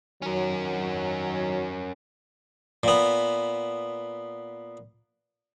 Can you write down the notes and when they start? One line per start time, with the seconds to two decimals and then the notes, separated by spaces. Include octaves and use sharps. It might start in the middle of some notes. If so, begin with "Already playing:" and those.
0.22 D#3 F#3 C#4 A#4
2.83 A#2 B3